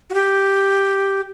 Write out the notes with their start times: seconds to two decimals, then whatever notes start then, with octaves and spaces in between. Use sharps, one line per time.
0.10 F#4
0.14 G4